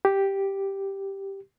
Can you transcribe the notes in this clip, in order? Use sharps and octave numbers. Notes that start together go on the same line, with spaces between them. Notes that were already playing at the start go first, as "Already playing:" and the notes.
G4